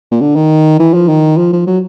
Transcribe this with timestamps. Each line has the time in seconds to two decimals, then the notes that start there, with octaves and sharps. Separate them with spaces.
0.11 A#2
0.21 D3
0.36 D#3
0.79 E3
0.94 F3
1.09 D#3
1.38 F3
1.53 F3
1.67 F#3